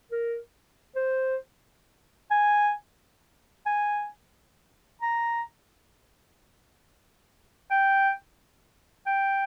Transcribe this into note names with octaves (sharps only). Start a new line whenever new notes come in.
A#4
C5
G#5
G#5
A#5
G5
G5